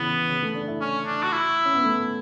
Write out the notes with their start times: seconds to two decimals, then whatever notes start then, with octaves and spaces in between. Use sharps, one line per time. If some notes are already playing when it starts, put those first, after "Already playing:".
Already playing: C#3 E3 B3
0.29 C#3
0.42 A3
0.55 D4
0.68 E4
0.81 C#4
1.06 D4
1.24 F#4
1.32 E4
1.65 C#4
1.74 B3
1.83 A3